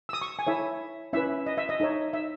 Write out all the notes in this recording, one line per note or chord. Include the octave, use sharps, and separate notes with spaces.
E6
D#6
C#6
G#5
E4 A4 C#5 E5
C#4 E4 B4 E5
D#5
E5
D#5
D#4 A4 C#5
E5